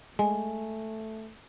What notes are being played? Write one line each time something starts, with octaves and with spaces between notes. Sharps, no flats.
G#3 A3 G#5